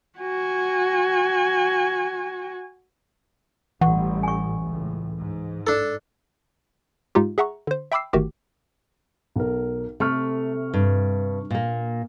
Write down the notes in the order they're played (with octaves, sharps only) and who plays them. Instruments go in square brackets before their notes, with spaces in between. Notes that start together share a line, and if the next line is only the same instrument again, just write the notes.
[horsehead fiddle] F#4 G#5
[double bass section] A1 A2 G3 [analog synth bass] E3 [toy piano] F#5 C#6
[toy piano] G#5 C#6
[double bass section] C#2 A2
G#2
[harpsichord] D4 A4
[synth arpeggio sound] G#2 G#3 D#4 F4 G4
G#4 E5 F#5 A#5 C#6
D3 C5
E5 G5 B5 D6 E6 C7
G1 D#3 A3 F#4 G4 D6
[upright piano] B1 A#4
[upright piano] C3 C#6 F6 [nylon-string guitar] A3
[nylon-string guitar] G2
A#2 A#3